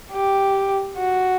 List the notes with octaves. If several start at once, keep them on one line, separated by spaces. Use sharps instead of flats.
G4
F#4